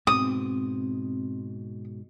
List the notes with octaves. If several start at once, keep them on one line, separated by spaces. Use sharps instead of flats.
G#2 B2 C4 D#6